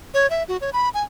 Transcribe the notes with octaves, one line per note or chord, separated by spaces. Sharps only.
C#5
E5
F#4
C#5
B5
G#5